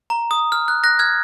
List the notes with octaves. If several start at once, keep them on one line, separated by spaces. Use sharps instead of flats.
A#5
D#6
F6
F#6
F#6 A#6
F6 G#6